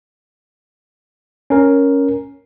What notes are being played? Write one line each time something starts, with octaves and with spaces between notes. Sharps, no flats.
C#4 A#4